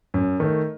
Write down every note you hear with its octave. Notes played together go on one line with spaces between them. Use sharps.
F#2
D#3 A3